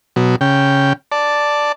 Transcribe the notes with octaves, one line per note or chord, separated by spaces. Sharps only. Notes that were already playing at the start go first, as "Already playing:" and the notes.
B2 F#3
C#3 G5
D5 A5